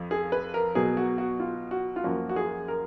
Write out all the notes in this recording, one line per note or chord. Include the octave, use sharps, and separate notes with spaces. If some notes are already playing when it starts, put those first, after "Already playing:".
Already playing: F2 F3
G#4
B4
A#4
B2 F#3 B3 G#4
F#4
F#4
F4
F#4
F4
F#2 F3 A#3 F#4
F#4
G#4
A#4